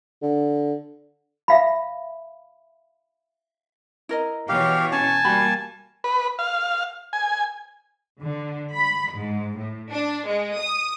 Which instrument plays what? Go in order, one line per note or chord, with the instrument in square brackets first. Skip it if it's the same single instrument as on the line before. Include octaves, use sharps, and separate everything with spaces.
[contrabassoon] D3
[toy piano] E5 F5 B5
[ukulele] E4 A#4 D#5
[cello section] B2 E3 C#5 [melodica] G4 F5
[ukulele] C#4 [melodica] G#5 A5
[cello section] G3 A#3 [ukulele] F#4 G4 B5
[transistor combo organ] B4
F5
G#5
[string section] D3
B5
G#2
A2
D4
G#3
D#6